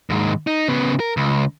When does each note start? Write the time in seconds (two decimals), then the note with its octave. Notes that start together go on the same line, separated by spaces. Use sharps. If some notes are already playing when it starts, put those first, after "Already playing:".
0.10 D#2 G#2
0.47 D#4
0.68 C#3 B3
1.00 A#4
1.17 C#2